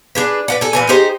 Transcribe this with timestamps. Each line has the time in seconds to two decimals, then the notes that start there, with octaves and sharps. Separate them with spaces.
0.15 D4 G#4 B4
0.48 B4 D5 F#5
0.61 G#4 A4
0.73 A#2 E3 G#5
0.89 D#4 G4 G#4 C5